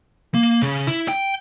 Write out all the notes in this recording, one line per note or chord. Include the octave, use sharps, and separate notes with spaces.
A#3
C#3
E4
G5